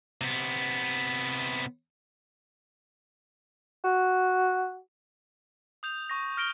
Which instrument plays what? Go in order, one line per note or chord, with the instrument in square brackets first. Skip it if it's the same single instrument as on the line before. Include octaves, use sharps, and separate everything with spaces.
[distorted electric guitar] C3 B3
[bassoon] F#4
[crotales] D#6 G6 F7
C#6 A#6
F6 A#6 D7 G7